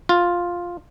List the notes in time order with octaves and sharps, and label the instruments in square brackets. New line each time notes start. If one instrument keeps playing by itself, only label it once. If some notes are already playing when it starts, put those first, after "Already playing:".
[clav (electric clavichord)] F4